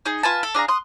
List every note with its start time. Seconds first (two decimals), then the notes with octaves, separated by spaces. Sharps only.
0.06 D#4 G#4
0.23 F4 B4 G#5 A5
0.43 A4
0.55 D4 G#4 F5 A#5
0.68 C6 D#6 F#6